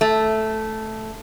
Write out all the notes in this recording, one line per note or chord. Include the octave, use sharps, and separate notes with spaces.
A3